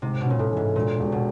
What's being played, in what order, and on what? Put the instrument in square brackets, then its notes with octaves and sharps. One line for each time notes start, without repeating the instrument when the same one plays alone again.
[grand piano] G#2 [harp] C3
[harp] B2
[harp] A#2 [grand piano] C#4
[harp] A2
[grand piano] E3
[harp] G#2
[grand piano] E1 [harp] A#2
[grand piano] E1
[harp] B2